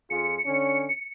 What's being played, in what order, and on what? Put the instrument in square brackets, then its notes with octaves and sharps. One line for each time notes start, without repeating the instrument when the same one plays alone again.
[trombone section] F2 F4 G#4 [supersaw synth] C#7
[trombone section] D3 C#4